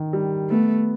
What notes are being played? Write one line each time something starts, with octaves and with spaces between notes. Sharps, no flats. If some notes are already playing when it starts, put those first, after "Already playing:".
Already playing: D#3
G3
A3 B3